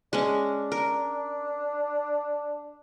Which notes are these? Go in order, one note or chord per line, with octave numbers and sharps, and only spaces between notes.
G#3 C#4 D4
A#4